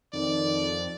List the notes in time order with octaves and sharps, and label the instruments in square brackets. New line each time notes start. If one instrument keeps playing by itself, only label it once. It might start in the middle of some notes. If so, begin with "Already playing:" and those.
[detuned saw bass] F2 [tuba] D#3 [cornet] D5